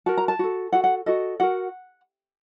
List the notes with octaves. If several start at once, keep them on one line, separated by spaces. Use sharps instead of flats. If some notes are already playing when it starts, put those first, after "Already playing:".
F#4 A#4 A5
A#5
A5
F#4 A4
F#4 A4 F#5
F#5
F#4 A4 D#5
F#4 A#4 F#5